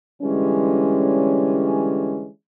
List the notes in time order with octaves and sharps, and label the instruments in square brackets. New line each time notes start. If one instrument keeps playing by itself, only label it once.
[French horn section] D3 E3 G3 G#3 C#4